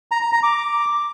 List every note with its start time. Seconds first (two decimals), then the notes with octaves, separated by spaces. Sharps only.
0.11 A#5
0.22 A#5
0.33 A#5
0.43 D6